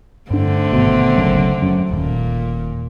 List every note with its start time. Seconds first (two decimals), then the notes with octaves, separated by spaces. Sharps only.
0.31 G2 D3 A3 C4 D4
0.73 G#1 B2
1.16 F#1 C#2 F#2
1.62 F#2
1.91 D#1 A#2